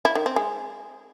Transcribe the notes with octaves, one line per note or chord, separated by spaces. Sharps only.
E4
D#3
C4
G#3